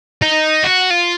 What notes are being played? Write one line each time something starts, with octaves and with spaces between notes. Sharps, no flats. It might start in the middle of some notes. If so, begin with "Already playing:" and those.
D#4
F#4
F4